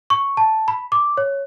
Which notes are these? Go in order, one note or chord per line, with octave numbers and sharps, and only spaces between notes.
C#6
A5
B5
D6
C#5